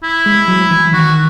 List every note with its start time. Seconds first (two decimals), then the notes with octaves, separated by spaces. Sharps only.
0.03 E4
0.26 G#3
0.48 F#3
0.71 E3
0.93 D#3 F#4